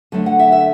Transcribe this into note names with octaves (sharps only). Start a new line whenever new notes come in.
D3 F#3 A3 D4
F#5
E5
E5